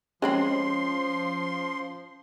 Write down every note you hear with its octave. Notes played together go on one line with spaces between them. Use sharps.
F3 G#3 C4 C#4 B5 C6